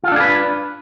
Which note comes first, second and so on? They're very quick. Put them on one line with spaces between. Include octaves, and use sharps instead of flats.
F4 A4 D4 G#4 B4